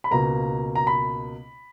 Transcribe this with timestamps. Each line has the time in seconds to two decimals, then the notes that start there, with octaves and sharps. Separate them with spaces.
0.04 B5
0.11 C#2 B2 A#3 A#5
0.75 A#5
0.87 B5